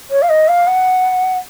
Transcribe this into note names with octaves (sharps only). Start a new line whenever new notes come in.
C#5
F5
D#5
F5
F#5